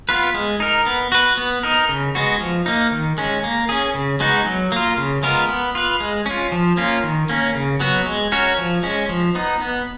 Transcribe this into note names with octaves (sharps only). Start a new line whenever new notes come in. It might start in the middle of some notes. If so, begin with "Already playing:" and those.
B3 F4 B4
G#3
D#4 A#4
B3
F#4 B4
B3
D#4 A#4
C#3
G#3 B3 F#4
F3
A#3 D#4
D#3
G#3 C#4
A#3
C#4 G#4
C#3
G#3 B3 D#4 F#4
F#3
A#3 F4
C#3
G#3 B3 F4 A#4
B3
F4 B4
G#3
C#4 F4
F3
A#3 C#4 F4
D#3
A#3 C#4
C#3
F#3 B3 F#4
G#3
C#4 F#4 A#4 C#5
F3
G#3 C#4
F3
B3 D#4
B3